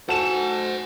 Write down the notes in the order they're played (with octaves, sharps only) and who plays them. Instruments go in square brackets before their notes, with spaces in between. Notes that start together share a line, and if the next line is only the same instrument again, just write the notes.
[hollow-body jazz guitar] F#4 [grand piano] A4 E7 [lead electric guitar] C5 G#5